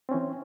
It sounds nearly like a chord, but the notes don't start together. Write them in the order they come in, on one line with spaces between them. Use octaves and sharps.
C4 C#4 E3